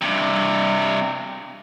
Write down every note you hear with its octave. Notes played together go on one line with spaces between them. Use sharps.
G2 C3